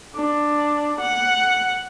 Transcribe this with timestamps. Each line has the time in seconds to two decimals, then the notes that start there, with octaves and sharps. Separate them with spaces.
0.15 D4
1.01 F#5